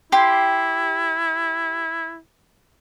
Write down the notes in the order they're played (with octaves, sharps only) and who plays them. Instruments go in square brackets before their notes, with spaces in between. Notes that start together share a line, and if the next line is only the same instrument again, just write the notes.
[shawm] E4 [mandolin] G4 C6